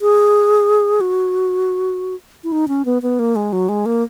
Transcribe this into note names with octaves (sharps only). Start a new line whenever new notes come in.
G#4
F#4
E4
D#4
C#4
B3
B3
A#3
G#3
F#3
G#3
A#3